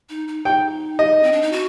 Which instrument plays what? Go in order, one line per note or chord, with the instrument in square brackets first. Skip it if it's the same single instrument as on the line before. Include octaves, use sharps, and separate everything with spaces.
[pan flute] D#4
D#4
[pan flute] D#4 [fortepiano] G5
[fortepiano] D#5
[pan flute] C4
D4
D#4
F#4